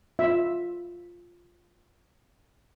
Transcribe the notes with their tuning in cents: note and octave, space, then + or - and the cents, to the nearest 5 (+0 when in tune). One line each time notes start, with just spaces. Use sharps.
F4 +0 E5 +0